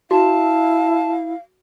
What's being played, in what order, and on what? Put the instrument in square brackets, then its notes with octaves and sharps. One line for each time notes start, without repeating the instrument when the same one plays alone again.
[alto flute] E4 [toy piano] F#4 [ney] F5 [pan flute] A5